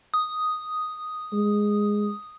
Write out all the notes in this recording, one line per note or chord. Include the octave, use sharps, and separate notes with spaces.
D#6
G#3